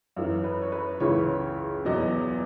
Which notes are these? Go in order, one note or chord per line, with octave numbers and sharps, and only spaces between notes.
F#2 E3
B4
C#5
B4
C#2 C#3 E3 C#5
E2 B2 F#3 D#5